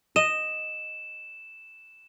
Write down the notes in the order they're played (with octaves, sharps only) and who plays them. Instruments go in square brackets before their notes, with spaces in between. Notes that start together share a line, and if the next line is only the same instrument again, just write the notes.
[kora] D#5 [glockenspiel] E7